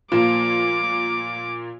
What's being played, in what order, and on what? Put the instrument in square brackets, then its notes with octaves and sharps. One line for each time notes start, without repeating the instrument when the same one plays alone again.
[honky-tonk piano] A#2 A#3 [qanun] F3 [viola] D6